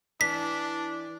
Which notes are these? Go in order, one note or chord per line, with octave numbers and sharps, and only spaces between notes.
E3 D4 B6